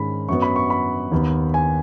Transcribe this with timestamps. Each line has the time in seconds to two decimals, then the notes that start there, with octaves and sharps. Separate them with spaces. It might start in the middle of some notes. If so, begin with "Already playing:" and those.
Already playing: G#2 D#3 G#3 C#4 B5
0.29 F#2 F#3 B3 C#6
0.42 B5
0.56 C#6
0.70 B5
1.12 D#2 D#3 B3
1.54 G#5